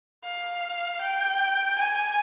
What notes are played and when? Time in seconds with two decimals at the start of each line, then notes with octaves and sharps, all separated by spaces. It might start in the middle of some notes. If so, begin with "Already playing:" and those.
0.25 F5
1.01 G5
1.79 G#5